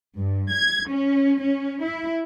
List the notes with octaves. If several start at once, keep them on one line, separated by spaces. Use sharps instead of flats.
G2
G#6
C#4
C#4
E4